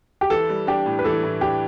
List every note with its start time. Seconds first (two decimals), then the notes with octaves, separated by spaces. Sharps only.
0.21 G4
0.30 E3 A4
0.49 G3
0.67 D4 G4
0.86 A2
0.99 B4
1.05 E3 A4
1.23 A2
1.41 D4 G4